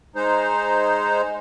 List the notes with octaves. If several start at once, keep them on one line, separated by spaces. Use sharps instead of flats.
G#3 D#4 C5